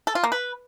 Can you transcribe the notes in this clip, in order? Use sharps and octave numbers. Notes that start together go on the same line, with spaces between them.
A4
F4
A#3
B4